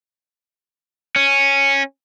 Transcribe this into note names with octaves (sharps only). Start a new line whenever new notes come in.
C#4